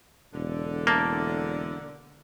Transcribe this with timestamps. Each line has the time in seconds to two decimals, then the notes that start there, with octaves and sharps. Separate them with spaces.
0.34 E1 D3
0.87 A#3 E4 A4